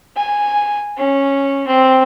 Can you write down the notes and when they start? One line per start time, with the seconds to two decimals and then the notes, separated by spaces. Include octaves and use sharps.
0.17 G#5
0.97 C#4
1.67 C4